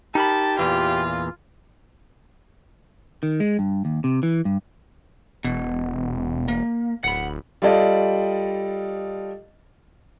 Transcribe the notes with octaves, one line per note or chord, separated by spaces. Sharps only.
D#4 G4 A#4 A5 B5
E2 A#2 E3 F4
D#3
G#3
G2
D#2
C3
E3
G2
E1 B2
A#3
D1 F#5 B5
G3 F4 A4 D5 D#5 F5